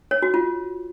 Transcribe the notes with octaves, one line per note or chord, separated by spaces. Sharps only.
C#5
F#4
F4